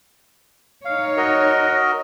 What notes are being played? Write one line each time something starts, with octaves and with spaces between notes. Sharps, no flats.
D#4 C#5 F5
F#4 A#4 D#5